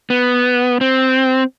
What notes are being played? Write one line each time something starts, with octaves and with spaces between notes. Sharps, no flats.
B3
C4